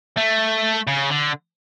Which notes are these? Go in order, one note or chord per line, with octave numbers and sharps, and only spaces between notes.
A3
C#3
D3